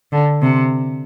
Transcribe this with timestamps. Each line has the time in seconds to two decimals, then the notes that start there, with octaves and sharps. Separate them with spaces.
0.12 D3
0.41 C3